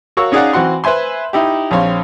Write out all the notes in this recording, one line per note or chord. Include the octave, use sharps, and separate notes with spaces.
F#4 A#4 C#5 F5 C#6 E6
C#4 D#4 G#4 D5 F5 F#5
E3 C4 F#4 F#5 C6
B4 C5 E5 G#5 C6
D#4 E4 G4
A#1 C4 C#5 F5 C6